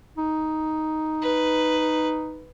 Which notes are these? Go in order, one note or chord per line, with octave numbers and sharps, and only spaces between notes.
D#4
B4